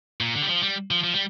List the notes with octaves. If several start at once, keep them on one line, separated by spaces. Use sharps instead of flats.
A#2
D3
G3
F3
G3
F3
F3
G3